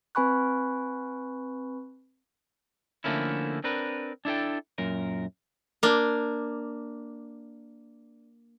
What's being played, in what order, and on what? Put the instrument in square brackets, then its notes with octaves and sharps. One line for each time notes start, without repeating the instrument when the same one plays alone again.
[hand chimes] C4 B4 G#5 B5 C#6 F#6
[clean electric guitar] D3 F3 A3 A#3 C#4 E4
C4 D4 A#4 B4
D4 E4 A4 G5
F#2 A#2 A#4
[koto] A#3 D4